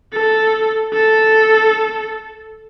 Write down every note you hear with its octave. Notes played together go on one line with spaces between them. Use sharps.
A4
A4